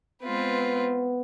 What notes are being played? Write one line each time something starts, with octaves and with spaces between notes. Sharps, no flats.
G#3 B3 C4 F4 B4